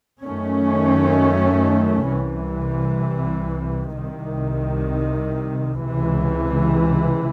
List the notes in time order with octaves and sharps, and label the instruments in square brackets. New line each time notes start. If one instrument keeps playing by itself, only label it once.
[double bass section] F#2 D#3 A3 C#4
C2 C3 E3
C2 C3 D#3
C#2 C3 E3